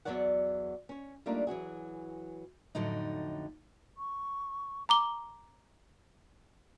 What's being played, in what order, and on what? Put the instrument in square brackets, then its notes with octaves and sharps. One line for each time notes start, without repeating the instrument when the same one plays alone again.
[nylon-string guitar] E2 E3 F#3 C#5 D5 F#5
C#4 C#5
G3 A3 A#3 D4 D#4 F4
E3 F#3 F#4 G#4
[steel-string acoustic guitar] F2 A2 D3 F#3 D#4
[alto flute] C#6
[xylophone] A#5 D6 G7